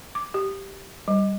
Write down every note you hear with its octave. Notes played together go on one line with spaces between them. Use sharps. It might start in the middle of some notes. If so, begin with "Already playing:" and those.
D6
G4
G3